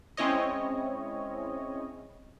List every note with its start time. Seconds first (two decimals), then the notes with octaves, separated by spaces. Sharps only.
0.17 G#3 C4 C#4 E4 C#5 D#5